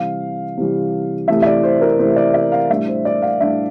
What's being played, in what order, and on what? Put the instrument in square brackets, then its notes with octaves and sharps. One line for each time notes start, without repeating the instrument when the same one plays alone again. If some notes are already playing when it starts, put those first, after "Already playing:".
Already playing: [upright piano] C3 E3 G3 F5
C3 E3 G3
C3 E3 A3 E4 E5
E5
D5
C5
A#4
C3 E3 A3 E4 C5
D5
E5
F5
A2 G3 D4 E5
C5
D5
F5
A2 G3 D4 E5